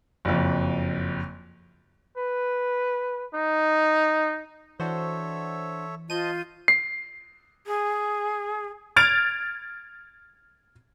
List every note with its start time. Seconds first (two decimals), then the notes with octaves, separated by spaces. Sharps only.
0.25 F#1 F2
2.17 B4
3.35 D#4
4.80 E3 D4 F#4 A4 C5 C#5 E5
6.10 F4 C5 D#5 A5 G6 D#7
6.68 C7
7.66 G#4
8.96 F6 G#6 A6 D7 F7